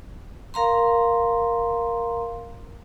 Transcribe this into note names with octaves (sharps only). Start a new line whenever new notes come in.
A#4 F5 A#5 C6